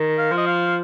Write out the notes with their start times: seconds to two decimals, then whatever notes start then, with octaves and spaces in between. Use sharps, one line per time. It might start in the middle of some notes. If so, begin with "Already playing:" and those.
Already playing: D#3
0.18 F5
0.32 F3
0.38 D#5
0.47 F5